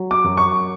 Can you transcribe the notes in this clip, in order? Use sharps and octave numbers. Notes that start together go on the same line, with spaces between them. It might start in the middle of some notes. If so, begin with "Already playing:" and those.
Already playing: F#3
D6
F#2
C#6